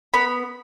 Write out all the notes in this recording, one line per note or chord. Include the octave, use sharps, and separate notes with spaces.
B3 B5